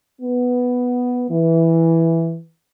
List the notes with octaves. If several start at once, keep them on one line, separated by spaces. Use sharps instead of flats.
B3
E3